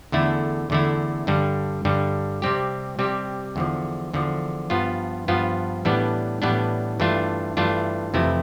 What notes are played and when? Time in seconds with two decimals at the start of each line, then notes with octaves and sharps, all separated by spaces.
0.12 E2 D3 A3 E4
0.70 E2 D3 A3 E4
1.27 G2 D3 G3
1.85 G2 D3 G3
2.42 C3 G3 C4 G4
2.99 C3 G3 C4 G4
3.56 E2 D3 F3
4.13 E2 D3 F3
4.70 G2 F3 B3 F4
5.28 G2 F3 B3 F4
5.85 A2 E3 G3 B3 D4
6.42 A2 E3 G3 B3 D4
7.00 G2 E3 A3 D4 F4
7.57 G2 E3 A3 D4 F4
8.14 F2 C3 E3 A3 E4